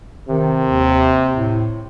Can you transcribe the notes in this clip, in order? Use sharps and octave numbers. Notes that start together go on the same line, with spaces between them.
C3 D#3
D#2
A2